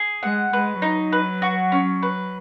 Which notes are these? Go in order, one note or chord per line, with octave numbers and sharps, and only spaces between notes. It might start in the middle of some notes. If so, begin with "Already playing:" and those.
Already playing: G#4
G#3 F#5
G#3 B4
F#3 D#4
B4
F#4
C#4
B4